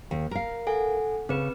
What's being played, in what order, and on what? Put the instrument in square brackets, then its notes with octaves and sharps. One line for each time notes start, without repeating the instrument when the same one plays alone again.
[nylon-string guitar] D#2
A#4 F5
[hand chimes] A4 F#5 G#5
[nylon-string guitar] C#3 [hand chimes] C4 B4